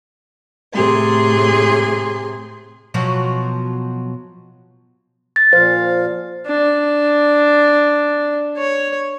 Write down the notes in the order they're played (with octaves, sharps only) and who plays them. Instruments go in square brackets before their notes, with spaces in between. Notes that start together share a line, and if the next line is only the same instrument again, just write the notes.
[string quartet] A2 C3 G#4 C6
[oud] B2 F3 F#3
[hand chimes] A6
[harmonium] A#2 F3 F5 [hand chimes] C5
[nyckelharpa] D4
C#5